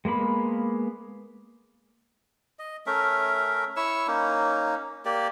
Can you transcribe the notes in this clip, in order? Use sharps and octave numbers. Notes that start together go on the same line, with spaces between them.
G#3 A#3 B3 B5
D#5
A3 C#4 A#4 E5
E4 C#5 C#6 E6
A#3 C#4 D#4
A#3 G4 D5